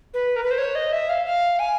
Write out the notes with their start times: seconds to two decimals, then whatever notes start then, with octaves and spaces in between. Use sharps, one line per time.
0.14 B4
0.36 A#4
0.43 B4
0.51 C5
0.58 C#5
0.75 D#5
0.92 E5
1.09 F5
1.26 F5
1.59 G#5